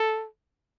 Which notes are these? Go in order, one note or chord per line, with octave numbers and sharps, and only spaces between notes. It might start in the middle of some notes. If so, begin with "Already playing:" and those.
Already playing: A4